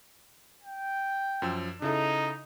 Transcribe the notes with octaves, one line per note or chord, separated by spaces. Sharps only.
G5
F#2 F3 E6
C#3 D#4 E4 A4